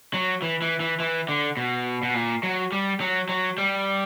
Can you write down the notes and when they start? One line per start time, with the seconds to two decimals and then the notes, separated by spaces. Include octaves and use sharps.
0.14 F#3
0.42 E3
0.62 E3
0.80 E3
1.00 E3
1.29 D3
1.57 B2
2.03 B2
2.14 A#2
2.43 F#3
2.72 G3
3.01 F#3
3.29 F#3
3.58 G3